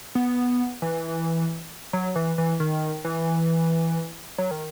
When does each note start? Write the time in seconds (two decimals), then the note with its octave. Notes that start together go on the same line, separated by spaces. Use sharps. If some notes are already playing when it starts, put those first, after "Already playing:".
0.15 B3
0.82 E3
1.93 F#3
2.16 E3
2.38 E3
2.60 D#3
3.05 E3
4.38 F#3
4.51 D#3